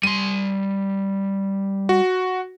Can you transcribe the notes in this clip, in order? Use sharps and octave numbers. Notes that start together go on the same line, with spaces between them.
G3 C6 D#7
F#4